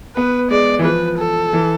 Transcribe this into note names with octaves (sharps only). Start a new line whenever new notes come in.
B3 B4
G#3 D5
E3
F3 B4
A4
E3